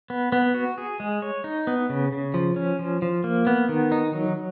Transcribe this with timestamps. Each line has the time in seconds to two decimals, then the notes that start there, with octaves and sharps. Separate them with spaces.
0.10 B3
0.32 B3
0.54 F#4
0.78 G#4
1.00 G#3
1.22 C#5
1.44 D#4
1.67 B3
1.90 C#3
2.12 C#3
2.34 F3
2.56 C#4
2.79 F3
3.02 F3
3.24 A#3
3.47 B3
3.69 D#3
3.92 D#4
4.13 F#3